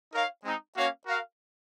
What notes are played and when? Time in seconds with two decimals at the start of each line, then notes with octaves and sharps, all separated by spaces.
0.12 D#4 A#4 C#5 F5
0.44 G#3 C4 D#4
0.75 A#3 C#4 F#4 C#5 F5
1.07 F#4 A#4 F5